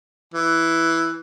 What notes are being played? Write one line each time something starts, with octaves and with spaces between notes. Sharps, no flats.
E3